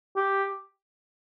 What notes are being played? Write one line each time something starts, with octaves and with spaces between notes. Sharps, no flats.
G4